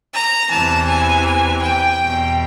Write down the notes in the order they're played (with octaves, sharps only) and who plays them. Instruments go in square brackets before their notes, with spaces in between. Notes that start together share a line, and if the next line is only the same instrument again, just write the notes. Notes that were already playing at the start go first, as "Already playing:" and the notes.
[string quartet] A#5
E2 C3 E3 A5
G#5
G#5
G5
E2 B2